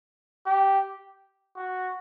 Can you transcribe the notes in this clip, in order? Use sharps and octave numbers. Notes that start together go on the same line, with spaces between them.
G4
F#4